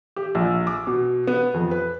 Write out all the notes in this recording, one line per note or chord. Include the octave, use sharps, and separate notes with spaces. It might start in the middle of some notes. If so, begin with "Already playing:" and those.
G4
A#1
D6
B2
B3
F2
B4